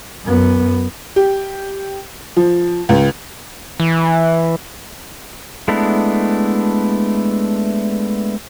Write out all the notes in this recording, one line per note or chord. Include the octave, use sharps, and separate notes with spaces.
F#2 B3
G4
F3
C#2
E3
G#3 A3 B3 D4 E4